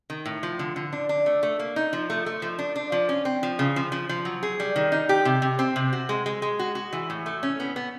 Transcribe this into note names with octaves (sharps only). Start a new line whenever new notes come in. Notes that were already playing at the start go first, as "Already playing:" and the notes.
D#3
A2
F3
D3
D3
D4
D4
A3
A3
A#3
D#4
F3
A3
A3
F3
D4
D4
F3
C#4
C4
F3
C#3
F3
F3
F3
F#3
G#4
G3
D#3
D#4
G4
C3
C3
C4
C3
F#4
G#3
G#3
G#3
F#4
F#4
E3
A2
A3
C#4
B3
B3